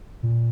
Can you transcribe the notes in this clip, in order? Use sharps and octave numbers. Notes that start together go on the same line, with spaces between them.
A#2